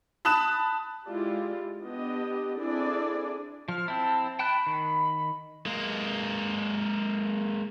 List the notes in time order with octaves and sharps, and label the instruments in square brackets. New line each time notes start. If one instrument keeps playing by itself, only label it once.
[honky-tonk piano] A5 B5 D#6 F#6 E7
[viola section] G#3 E4 F4 G4 D5
B3 D4 G4 D#5
C4 D4 E4 G#4 A4 D5
[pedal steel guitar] F3 [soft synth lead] F6
[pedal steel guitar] C4 E4 [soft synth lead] A5
[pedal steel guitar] G5 A5 F#6 [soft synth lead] B5
[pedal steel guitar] D#3
[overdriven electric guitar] G#3 A#3